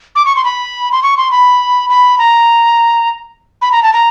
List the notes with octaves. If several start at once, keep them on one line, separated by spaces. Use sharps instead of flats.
D6
C#6
C6
B5
C6
C#6
C6
B5
B5
A#5
B5
A#5
A5
A#5